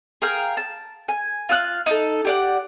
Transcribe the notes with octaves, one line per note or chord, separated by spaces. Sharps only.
G#4 A#4 F5 G5
A5
G#5
F4 F5 E6 F#6
D#4 A4
G4 D5 F#5